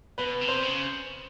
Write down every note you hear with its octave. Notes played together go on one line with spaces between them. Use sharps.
B2 B4
C3
C5
C#3